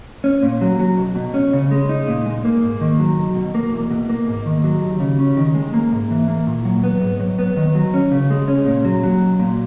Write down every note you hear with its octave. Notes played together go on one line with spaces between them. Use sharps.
C#4
A#2
F#3
F#3
B1
B2
C#4
C#3
G#3
D#4
A#2
G#3
A#3
G#2
D#3
F#3
B1
B2
A#3
E2
B2
A#3
G#2
D#3
F#3
D#2
C#3
C#4
D#3
G#3
A#3
G#2
E3
A#3
A#2
F#3
B3
G#2
F#3
B3
D#3
F#3
C#4
C#3
G#3
C#4
A#2
F#3
F#3
B1
A#2